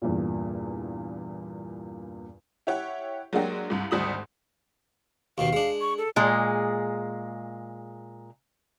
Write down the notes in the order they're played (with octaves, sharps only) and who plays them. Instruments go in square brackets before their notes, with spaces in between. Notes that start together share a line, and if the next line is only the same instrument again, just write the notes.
[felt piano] E2 G2 A#2
[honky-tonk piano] E4 G4 C#5 F#5
F#3 G#3 A#3 D4 F#4 G4
C2 G2
G#1 D2 G3 D#6 F#7
[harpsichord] D#2 B2 D#3 [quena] F5
[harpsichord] G#3 D4
[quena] C#6
A4
[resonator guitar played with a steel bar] A#2 G#3 G#4